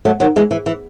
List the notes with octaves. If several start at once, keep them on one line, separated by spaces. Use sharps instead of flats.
F#3 A3
D#3 F#3
E3 G#3
E3
E3